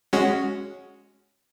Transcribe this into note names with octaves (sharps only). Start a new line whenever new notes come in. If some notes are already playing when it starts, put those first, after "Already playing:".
G#3 C#4 F#4